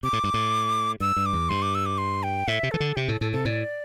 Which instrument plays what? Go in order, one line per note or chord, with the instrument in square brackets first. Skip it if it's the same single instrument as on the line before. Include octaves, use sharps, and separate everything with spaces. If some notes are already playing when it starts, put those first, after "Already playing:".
[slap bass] C3 [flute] D6
[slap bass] A2
G2
A2
[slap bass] G2 [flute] E6
[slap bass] G2
[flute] D6
[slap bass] E2
[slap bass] G2 [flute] C6
[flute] D6
E6
D6
C6
G5
[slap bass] A2 [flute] E5
[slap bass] C3
[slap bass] E3 [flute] A4
[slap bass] D3
[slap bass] C3 [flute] G4
[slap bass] A2 [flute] A4
[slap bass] A2 [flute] A4
[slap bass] C3 [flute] A4
[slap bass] A2 [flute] D5